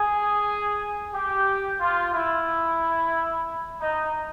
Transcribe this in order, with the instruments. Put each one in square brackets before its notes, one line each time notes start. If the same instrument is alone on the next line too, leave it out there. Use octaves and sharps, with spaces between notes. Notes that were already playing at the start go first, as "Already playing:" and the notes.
Already playing: [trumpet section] G#4
G4
F4
E4
D#4